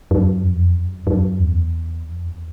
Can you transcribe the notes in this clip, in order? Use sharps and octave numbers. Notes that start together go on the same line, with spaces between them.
F#2
F2
F#2
F#2
E2
F2
E2